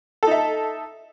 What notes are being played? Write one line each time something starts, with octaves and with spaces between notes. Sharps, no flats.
D#4 A4 E5